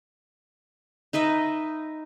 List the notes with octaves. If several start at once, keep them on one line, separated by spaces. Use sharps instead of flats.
D#4 B4 D#5 E5